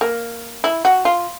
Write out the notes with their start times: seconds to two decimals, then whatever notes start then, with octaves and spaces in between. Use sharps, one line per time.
0.01 A#3
0.64 E4
0.85 F#4
1.05 F4